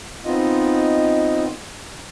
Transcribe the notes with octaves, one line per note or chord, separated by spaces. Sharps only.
B3 C4 D#4 F4 D#5